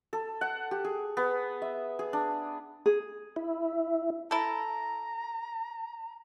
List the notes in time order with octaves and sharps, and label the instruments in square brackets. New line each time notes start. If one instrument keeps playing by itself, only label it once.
[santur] A4
F#5
G4
G#4
B3
E5
G#4
D4
[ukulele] G#4
[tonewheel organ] E4
[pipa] E4 A4 [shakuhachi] A#5